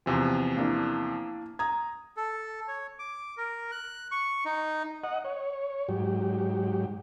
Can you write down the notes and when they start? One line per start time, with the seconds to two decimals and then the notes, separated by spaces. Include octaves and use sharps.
0.06 E2 C3 F3 G#5
0.57 A#3 D4 E4
1.59 A#5 D#6 G#6
2.17 A4
2.68 C#5
2.99 D6
3.37 A#4
3.72 F#6
4.11 C#6
4.45 D#4
5.04 D#5 F#5
5.24 C#5
5.88 G#2 F#3 G4